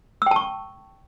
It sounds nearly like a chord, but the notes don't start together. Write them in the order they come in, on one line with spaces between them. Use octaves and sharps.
E6 G5 A5 C#6